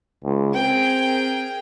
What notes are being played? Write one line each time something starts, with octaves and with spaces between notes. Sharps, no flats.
C#2
C4 G#4 A#4 G5